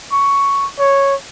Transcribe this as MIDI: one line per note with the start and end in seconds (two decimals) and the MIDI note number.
0.12 0.67 85
0.79 1.15 73